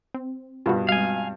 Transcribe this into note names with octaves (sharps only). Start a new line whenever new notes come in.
C4
G2 B2 F4 F#4 B5
G3 G#3 C4 F5 G#5